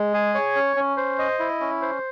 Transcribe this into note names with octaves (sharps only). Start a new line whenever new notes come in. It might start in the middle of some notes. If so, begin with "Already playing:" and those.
Already playing: G#3
G#4
C#5
C#4
C#4
C5
D#5
E4
C#4
C5